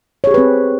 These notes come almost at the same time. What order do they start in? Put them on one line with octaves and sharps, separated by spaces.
C#5 G#4 G4 B4 C4